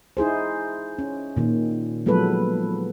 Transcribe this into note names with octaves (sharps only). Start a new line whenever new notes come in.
D#4 E4 G#4 C5
C#4
A#2 D#3
F3 F#3 G#3 B3 A4 B4